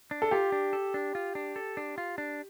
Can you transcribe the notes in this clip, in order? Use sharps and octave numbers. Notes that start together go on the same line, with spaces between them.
D4
A4
F4 G4
D4
A4
D4
F4
D4
A4
D4
F4
D4